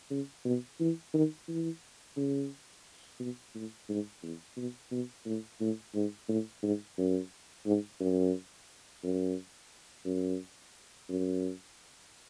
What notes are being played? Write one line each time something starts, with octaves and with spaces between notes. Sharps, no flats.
C#3
B2
E3
D#3
E3
C#3
B2
A2
G#2
E2
B2
B2
A2
A2
G#2
A2
G#2
F#2
G#2
F#2
F#2
F#2
F#2